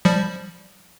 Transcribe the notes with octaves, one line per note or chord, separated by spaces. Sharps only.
F3 G3